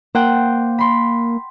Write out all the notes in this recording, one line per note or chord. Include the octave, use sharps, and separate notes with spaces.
A#3 C5 F#5 G5
B5 C6